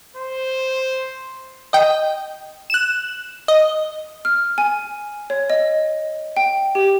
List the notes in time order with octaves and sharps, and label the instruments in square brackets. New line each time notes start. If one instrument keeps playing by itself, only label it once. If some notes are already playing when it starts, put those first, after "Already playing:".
[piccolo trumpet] C5
[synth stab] D#5 G5
F#6 E7
D#5
[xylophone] F6
G#5
C#5
D#5
G5
G4